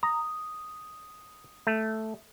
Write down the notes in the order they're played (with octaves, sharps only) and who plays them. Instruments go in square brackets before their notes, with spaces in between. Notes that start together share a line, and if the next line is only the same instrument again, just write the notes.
[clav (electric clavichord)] A#5 [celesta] D#6
[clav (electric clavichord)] A3